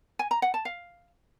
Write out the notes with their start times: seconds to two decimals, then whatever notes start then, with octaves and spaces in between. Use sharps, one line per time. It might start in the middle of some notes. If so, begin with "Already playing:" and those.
0.19 G#5
0.31 A#5
0.42 F#5
0.54 A5
0.65 F5